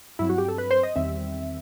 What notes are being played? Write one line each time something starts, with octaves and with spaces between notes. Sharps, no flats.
G2 F#3 C4 E4
F#4
G4
A4
B4
C5
D#5
E2 D#3 G3 C4 E5